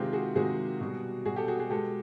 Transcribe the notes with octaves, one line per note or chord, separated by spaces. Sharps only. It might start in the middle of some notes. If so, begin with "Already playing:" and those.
Already playing: C3 D#3 G#3 F4 G4
F#4 G#4
C3 D#3 G#3 F#4 G#4
B2 G3
B2 G3 F#4 G#4
G4 A4
F#4 G#4
F#4 G#4
B2 G#3 G4 A4